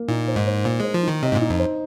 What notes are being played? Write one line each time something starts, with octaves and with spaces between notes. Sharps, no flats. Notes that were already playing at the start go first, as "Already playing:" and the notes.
Already playing: A#3
A#2 D#4
C5
G#2
C5
A#2 C5
G#3 C5
F3
D#3 D#4
C3 D#5
G#2
A#2
D#4
F2
C5